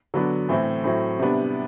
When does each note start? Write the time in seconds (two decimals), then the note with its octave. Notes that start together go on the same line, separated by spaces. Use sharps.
0.14 D3 F#3 B3 D4
0.49 A2 E3 A3 C4 E4
0.84 A2 F#3 C4 E4
1.19 C3 G3 B3 D4